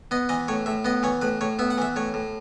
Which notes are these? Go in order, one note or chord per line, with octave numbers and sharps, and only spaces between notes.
B3 D#5
E3 D#5
A2 C#5
A2 E5
B3 D#5
E3 C#5
A2 B4
A2 C#5
B3 E5
F#5
E3 E5
A2 C#5
A2